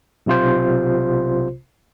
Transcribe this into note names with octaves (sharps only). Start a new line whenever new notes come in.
B1 C3 F4 C5